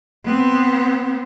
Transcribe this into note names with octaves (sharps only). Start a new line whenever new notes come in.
B3 C4